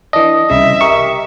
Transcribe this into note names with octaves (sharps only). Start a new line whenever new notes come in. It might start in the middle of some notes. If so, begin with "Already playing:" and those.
E3 D4 D#5
C2 C#3 E5
G4 A#4 D#5 C#6